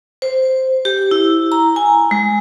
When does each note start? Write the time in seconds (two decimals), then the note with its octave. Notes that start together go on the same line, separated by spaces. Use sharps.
0.22 C5
0.85 G4
1.11 E4
1.52 A#5
1.76 G#5
2.11 G#3